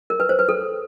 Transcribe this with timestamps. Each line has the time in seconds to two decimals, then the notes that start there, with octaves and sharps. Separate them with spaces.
0.10 A#4
0.20 B4
0.29 C5
0.39 B4
0.49 A4